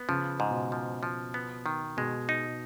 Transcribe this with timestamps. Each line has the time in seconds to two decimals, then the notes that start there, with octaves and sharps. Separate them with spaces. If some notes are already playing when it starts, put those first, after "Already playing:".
Already playing: B3
0.09 C#3 F3
0.40 G#2
0.51 B2
0.72 F3
1.03 F3
1.34 B3
1.66 D#3
1.97 B2 G#3
2.29 D#4